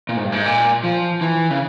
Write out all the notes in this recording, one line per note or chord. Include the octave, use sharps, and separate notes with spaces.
A#2
G#2
G2
G#2
A#2
F3
E3
C#3